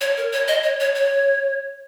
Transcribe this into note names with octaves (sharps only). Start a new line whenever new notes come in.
C#5
A#4
C#5
D#5
C#5
C#5
C#5